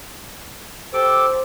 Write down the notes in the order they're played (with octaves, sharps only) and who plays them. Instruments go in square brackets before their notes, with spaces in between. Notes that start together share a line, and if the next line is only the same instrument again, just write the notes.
[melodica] G4 A4 D6 [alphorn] C5